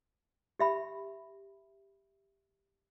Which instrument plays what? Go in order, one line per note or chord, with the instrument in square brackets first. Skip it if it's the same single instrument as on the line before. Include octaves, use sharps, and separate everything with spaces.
[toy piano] G4 E5 B5